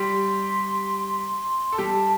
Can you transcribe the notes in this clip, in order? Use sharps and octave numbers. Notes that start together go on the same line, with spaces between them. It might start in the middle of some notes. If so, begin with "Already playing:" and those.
Already playing: G3 G4 C6
A4
G3 G4 A5